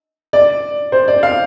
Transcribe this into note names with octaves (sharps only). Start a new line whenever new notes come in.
D5
C5
D5
F5